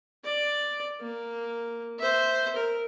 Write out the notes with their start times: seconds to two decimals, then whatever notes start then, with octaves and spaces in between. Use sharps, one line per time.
0.25 D5
1.01 A#3
1.99 C5 E5
2.56 A#4